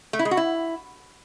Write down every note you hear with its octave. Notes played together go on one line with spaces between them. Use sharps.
A3
E4
G#3
F#4
E4